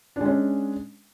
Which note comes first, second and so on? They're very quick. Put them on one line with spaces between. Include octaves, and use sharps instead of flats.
D4 G#3 C#4